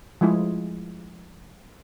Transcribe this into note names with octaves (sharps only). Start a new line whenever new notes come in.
F3 G#3 A3 E4 F4 G#4